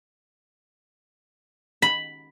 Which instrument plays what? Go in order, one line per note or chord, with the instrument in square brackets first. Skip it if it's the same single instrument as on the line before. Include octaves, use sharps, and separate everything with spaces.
[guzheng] B5